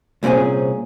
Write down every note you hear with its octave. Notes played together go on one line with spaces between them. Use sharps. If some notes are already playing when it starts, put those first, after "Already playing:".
C2 A#2 C4 C#4 G#4